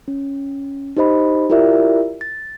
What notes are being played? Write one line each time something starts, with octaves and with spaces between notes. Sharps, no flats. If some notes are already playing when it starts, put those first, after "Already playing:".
C#4
D#4 G4 C5 D#5 B5
E4 F4 G4 A#4 D5 E5
A6